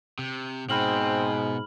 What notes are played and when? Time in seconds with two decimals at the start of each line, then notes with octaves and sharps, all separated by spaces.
0.19 C3
0.70 G#2 B2 C4 B5 F6 F#7